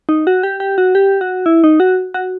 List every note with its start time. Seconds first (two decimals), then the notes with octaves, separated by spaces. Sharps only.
0.09 D#4
0.27 F#4
0.43 G4
0.60 G4
0.78 F#4
0.95 G4
1.21 F#4
1.46 E4
1.64 D#4
1.80 F#4
2.14 F#4